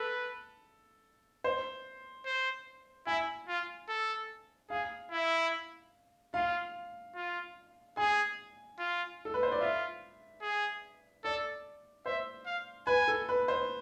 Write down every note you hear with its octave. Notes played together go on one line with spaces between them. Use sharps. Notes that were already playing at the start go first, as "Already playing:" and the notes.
Already playing: A4 B4
C5
C5
E4 G#5
F4
A4
G#4 F5
E4
F4 F5
F4
G#4 G#5
F4
A4
B4
C5
D5
F4 E5
G#4
A4 D5
C5 E5
F5
B4 G#5
A4
B4
C5